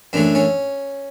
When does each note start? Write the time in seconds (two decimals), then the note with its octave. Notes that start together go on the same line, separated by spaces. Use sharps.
0.13 F#2 E3 A3 D4
0.35 C#4